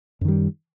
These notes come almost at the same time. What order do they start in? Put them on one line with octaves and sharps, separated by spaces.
F#2 D#3 G3